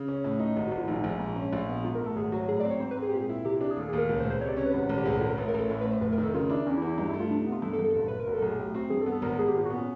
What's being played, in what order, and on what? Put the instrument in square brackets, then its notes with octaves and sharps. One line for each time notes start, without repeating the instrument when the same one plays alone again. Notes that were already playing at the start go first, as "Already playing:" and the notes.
Already playing: [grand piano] C#3
C#4
A2
D#4
G#1
[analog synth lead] F#4
[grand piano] G#1
[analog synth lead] F4
E4
[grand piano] A#1 [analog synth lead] D#4
[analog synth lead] D#4
[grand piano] A#1
G#2
C#4
A#1
B3
[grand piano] G#2 [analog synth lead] F4
[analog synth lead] A#4
[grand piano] A3
[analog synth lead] A4
[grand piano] G#1 [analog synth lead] G#4
[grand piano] F#3 [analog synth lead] F#4
[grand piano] A2 [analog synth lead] G#4
[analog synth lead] D5
[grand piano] C4
[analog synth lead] C#5
[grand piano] G#2 [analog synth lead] C5
[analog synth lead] B4
[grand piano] C4
[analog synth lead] G#4
G4
[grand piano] A#2 [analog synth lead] G#4
[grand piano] E4
[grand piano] C3 [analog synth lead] G4
[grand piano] D4 [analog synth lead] G4
[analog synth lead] G#4
[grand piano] D#2 [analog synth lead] A4
[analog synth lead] G#4
[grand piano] D#2 [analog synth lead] A#4
[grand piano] C#2
[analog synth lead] C5
[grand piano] C#2
[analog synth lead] C5
[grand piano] C3 [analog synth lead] C#5
[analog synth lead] D5
[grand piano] C#4 [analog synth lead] C#5
[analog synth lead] B4
[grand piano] G#1
G#1
[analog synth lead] G4
[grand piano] C#2 [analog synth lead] G#4
[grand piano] C#2 [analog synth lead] A4
[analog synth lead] A#4
[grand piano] A1 [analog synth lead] B4
[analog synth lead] A#4
[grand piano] A1 [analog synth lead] A4
[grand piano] A2 [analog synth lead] A#4
[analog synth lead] B4
[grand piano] A2
[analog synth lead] C5
[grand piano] F1 [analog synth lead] B4
[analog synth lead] A#4
[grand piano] D#3 [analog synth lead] A4
[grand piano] C#3 [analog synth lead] F4
[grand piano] D4 [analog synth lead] E4
[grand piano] E2 [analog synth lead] C#4
[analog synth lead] E4
[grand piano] E2
[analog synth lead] E4
[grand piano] G2 [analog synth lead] D#4
[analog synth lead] E4
[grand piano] A3
[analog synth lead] F4
[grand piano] C3 [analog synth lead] D4
[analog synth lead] D#4
[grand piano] B3
[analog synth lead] F4
[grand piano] G2 [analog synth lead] A4
[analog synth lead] A4
[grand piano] G2
[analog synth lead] A4
[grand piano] F#1
[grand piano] F#1 [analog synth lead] B4
[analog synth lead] A#4
[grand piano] B1
[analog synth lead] A4
[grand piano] B1 [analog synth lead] G#4
[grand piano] A2 [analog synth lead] G4
[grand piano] C4 [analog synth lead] F#4
[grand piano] G2 [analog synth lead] G#4
[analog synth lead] A4
[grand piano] B3
[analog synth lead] A4
[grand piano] G#1 [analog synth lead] A#4
[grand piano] G#1 [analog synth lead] G#4
[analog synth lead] G4
[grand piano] A#2 [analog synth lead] G#4
[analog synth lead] F#4
[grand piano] B3
[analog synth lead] C#4